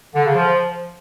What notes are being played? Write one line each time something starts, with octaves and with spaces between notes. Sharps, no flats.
D3
C#3
F3